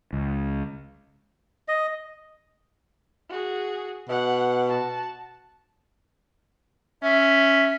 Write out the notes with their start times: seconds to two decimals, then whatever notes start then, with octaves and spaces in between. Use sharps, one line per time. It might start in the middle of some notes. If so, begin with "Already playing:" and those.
0.13 C#2
1.68 D#5
3.29 F#4 G#4
4.09 B2 F#5
4.67 F#4 A5
7.02 C#4 E5